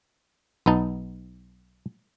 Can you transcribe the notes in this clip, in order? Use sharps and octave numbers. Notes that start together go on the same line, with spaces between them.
B1 B3 D#4 A5